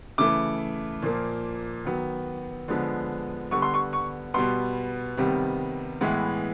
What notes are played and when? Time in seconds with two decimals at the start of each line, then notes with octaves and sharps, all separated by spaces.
0.18 C#3 E3 A3 D6
1.02 A#2 F3 A#3
1.85 D#3 F#3 B3
2.68 D3 F3 G#3 B3
3.51 D3 G3 B3 C#6
3.62 C6
3.74 C#6
3.93 C#6
4.34 B2 G3 B3 C6
5.17 C3 D#3 G3 B3
6.01 A2 E3 G#3 B3